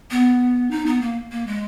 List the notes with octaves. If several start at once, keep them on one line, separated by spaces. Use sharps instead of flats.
B3
D#4
B3
A#3
A#3
G#3